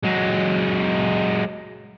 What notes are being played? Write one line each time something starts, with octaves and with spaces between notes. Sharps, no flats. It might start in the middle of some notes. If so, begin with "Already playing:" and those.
F#3 G#3